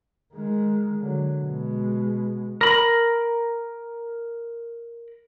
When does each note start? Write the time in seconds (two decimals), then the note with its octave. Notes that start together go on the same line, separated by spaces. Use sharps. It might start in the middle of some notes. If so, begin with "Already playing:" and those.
0.33 D#3 G#3
1.00 D3 F#3
1.42 B2 G#3
2.61 A#4 B5